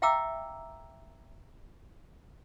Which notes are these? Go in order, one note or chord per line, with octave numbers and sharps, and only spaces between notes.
E5 F5 G5 A#5 D6 E6